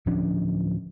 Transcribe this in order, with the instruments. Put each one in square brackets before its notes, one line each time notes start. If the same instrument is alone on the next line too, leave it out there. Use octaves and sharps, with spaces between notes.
[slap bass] D1 F3 C#4 D4